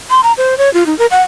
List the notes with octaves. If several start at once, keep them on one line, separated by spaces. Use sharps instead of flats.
C6
A#5
C5
C#5
F4
D#4
A#4
F#5